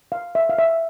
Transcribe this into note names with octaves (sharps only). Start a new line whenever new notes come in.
F5
E5
F5
E5